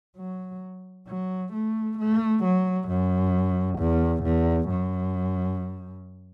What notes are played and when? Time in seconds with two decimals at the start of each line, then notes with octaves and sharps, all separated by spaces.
0.17 F#3
1.08 F#3
1.53 A3
1.98 A3
2.43 F#3
2.88 F#2
3.79 E2
4.23 E2
4.69 F#2